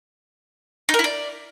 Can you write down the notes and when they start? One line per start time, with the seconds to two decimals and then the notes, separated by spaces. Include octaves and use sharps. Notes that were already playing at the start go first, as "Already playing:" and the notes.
0.89 D#4
0.94 A#4
0.99 E4
1.04 D5